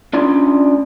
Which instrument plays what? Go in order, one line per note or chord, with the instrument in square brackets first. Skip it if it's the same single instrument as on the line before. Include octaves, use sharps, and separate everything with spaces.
[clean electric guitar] C#4 D4 F4 D5 C6